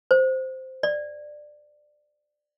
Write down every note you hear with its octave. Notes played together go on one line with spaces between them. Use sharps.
C5
D5